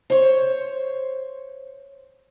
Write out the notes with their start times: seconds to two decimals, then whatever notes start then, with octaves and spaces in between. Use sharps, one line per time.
0.10 C5 C#5